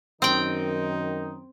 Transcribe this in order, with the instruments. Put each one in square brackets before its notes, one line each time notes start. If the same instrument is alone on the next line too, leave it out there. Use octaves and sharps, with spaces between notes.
[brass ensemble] F#2 D#3 D#4 [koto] C4 G5